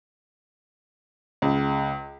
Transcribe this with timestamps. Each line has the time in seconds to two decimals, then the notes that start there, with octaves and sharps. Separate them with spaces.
1.42 C#2